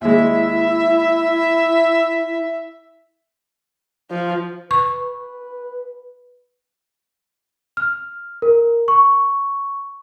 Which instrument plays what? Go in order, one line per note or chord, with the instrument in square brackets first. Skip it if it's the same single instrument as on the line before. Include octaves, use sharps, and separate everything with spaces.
[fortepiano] D#2 G#3 [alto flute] E4 [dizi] E5
[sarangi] F3
[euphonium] B4 [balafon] C#6
[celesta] F6
A#4
C#6